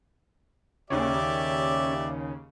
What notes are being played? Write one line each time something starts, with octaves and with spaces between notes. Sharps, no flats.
D#2 C#3 C#4 G4 C#5 D5 E5